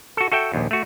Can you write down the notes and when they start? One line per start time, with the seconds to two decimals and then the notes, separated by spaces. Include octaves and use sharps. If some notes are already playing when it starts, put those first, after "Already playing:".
0.17 F#4 A4
0.32 F#4 A4 E5 G5
0.53 A#1 D#2
0.71 A3 F#4